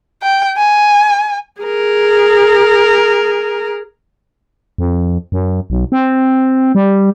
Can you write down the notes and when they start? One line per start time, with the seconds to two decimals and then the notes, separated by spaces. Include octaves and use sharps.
0.22 G5
0.58 G#5
1.61 G#4 A#4
4.78 F2
5.32 F#2
5.70 B1
5.92 C4
6.75 G3